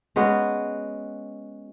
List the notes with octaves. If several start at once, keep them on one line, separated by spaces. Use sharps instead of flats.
G#3 B3 C#4 F#4